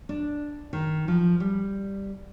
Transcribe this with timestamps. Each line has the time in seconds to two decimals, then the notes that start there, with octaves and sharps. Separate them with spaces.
0.09 D4
0.73 D#3
1.08 F3
1.40 G3